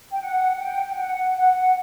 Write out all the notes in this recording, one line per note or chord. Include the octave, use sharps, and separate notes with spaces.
G5
F#5
G5
G5
F#5
F#5